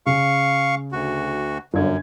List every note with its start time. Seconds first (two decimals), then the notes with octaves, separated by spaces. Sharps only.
0.06 C#3 F5 C#6
0.92 D2 F#4
1.74 G1 F#2 D4 G#6